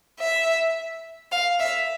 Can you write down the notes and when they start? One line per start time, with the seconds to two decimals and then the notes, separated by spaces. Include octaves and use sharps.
0.20 E5
1.32 F5
1.59 E5